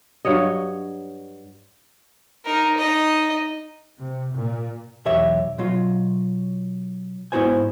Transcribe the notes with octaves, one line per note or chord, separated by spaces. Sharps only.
G2 F#3 C#5 D#5
D#4 A#4
D#4 D#5
C3
A#2
B1 E2 G4 C#5 E5
B2 F#3 F4
G#2 B3 E4 F#4 C5 G#5